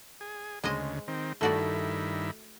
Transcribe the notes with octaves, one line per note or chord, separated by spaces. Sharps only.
G#4
D2 C#3 G#3 C5 D#5
D#3 C4
G2 D#3 A3 E4 F#4 D5